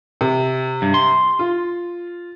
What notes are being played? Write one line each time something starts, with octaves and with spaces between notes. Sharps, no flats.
C3
G2
C6
F4